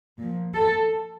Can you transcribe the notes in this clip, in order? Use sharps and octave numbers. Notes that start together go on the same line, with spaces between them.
A#2 F3
A4